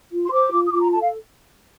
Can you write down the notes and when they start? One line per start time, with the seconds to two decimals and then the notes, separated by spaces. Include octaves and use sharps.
0.12 F4
0.25 C6
0.31 C5 D6
0.52 F4
0.66 D#6
0.72 F4 D6
0.81 A#5
0.91 A4 A5
1.01 F5